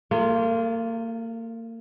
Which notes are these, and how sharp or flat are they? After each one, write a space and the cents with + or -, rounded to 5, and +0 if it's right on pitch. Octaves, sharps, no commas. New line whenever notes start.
A#3 -35 F4 +5 G#4 +40